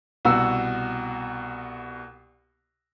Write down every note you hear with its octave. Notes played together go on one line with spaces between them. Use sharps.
C2 B2 F#4 E6